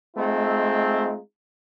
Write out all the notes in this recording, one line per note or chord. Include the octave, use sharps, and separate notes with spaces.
G#3 A3 C4 D#4 F4